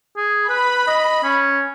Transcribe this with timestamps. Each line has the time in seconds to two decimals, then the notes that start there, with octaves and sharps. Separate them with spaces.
0.17 G#4
0.49 B4 B5
0.87 D#5
1.23 C#4